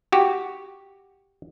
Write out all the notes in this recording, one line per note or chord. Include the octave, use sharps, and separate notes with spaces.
F#4 G4